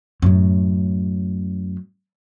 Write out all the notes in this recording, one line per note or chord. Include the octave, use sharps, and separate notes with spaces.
F#2 A2